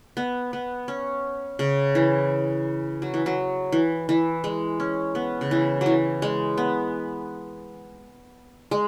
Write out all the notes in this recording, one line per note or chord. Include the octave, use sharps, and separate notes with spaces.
B3
B3
C#4
C#3
E3
F#3
E3
F#3
E3
E3
G#3
C#4
B3
C#3
E3
F#3
E3
G#3
B3
G#3